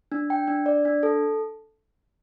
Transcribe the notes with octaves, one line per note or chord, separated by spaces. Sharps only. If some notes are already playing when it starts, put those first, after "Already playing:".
D4
G5
D4
D5
D4
A4